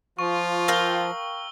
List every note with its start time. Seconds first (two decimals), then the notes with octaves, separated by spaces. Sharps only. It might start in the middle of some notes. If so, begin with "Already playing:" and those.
0.19 F3 F4 C#6
0.68 A#4 F5 G5 E6 G7